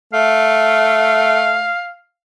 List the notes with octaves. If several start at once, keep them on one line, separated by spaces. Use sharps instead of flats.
A3 F5